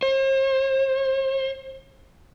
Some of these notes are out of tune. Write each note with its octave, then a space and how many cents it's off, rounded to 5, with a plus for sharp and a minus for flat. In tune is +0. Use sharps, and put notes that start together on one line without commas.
C5 +40